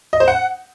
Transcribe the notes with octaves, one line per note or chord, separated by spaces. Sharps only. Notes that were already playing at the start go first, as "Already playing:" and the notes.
D#5
C5
F#5